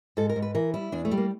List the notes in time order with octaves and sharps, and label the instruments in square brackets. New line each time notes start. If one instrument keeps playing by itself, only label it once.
[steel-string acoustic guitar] G#2 A4
A#4
G#2
B4
E3 A#4
G3 E4
E2 D4
A3
G3
A#3